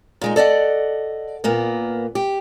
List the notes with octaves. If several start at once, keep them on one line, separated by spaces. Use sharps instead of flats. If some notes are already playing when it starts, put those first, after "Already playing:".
A#2 G#3 D#4
A4 D5 D#5 F#5
A#2 A#3 B3
G4